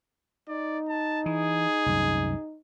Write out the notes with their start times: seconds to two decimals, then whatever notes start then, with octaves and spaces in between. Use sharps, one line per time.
0.49 D#4 D5
0.89 A5
1.26 E3 G#4
1.86 C2 F#2